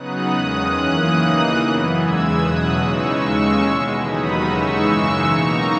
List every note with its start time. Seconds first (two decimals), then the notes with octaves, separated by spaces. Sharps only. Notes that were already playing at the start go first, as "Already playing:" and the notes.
Already playing: C#3 F#3 B3 D#4 D#6 F#6
0.32 E2 D#3 G#3 C#4 D#6 F#6
0.73 F#2 E3 A#3 C#4 D#6 F#6
1.15 D#2 C#3 E3 A#3 D#4
1.56 F#2 E3 B3
1.97 E2 C#3 E3 G#3 E6 G#6
2.38 E2 B2 F#3 D#6 F#6
2.80 C#3 E3 G#3 D#4 C#6 E6
3.20 D#2 C#3 G#3 C#4
3.62 E2 B2 G#3
4.03 D#2 D#3 F#3 B3 D#4 B5 D#6
4.44 C#3 E3 G#3 D#4 C#6 E6
4.85 F#2 C#3 E3 G#3
5.26 B2 A#3 D#4 A#5 C#6